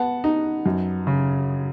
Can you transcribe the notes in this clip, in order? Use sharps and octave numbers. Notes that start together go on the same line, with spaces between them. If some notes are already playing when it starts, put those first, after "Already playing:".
Already playing: B3 F#5 A5
D#4
F#2
C#3